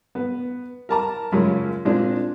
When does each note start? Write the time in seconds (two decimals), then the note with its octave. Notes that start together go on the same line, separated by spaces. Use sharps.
0.15 B3
0.89 A#4 A5 A#5
1.32 F#2 C#3 G#3 A#3 C#4 F4
1.85 A#2 G#3 C4 D4 F4